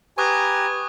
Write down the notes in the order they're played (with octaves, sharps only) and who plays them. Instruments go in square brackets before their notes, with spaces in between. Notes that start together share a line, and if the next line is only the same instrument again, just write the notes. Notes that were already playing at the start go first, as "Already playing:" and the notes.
[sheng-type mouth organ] G4 A#5 [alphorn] B4 [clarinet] G#5 [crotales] C#6 D#6 F#6